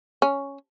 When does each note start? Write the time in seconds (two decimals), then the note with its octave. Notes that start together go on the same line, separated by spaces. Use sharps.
0.22 C#4